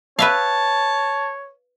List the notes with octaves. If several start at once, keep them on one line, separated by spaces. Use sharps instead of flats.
B4 C#5 E5 F5 A5